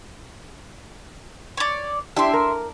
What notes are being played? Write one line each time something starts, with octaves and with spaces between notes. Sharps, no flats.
C#5 D5
D4 E4 G4 E5 C6
A#4